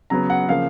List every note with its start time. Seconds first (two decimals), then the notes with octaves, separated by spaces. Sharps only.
0.10 C#3 F#3 B3 A#5
0.30 F#5
0.48 C#3 F3 A#3 F5